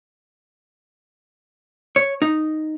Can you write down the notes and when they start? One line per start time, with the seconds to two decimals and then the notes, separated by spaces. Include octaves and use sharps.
1.96 C#5
2.22 D#4